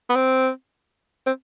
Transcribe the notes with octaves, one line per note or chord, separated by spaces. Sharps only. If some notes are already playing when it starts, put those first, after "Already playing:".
B3
C4
C4